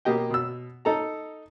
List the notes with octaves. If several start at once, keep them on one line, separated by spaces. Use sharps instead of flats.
B2 A#3 G4 D#5 G5
B2 E6
D#4 A4 A#5